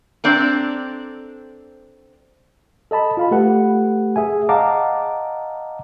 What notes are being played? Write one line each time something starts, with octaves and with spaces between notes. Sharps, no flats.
C4 D4 A4 A#5
A4 D#5 A5 B5
F4 F5 B5
A3 G4 A4 B4 F#5
G#4 E5 G#5
D#5 F5 F#5 A5 A#5 D6